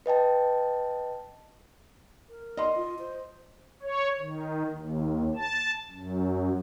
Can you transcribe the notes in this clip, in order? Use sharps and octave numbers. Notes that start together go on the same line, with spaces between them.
B4 D#5 G5 A5
A#4
D#5 C6
F4
C5
C#5
D#3
D#2
A5
F#2